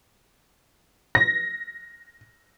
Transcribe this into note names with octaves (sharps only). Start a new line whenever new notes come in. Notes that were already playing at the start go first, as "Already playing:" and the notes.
A#6